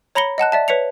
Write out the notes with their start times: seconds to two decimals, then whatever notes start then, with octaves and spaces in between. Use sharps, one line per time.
0.15 C#5 A#5 B5 A#6 C#7 G7
0.38 D#5 F#5 A5 F#6
0.52 D5 E5 A5
0.68 B4 C#5 B6 C#7 F7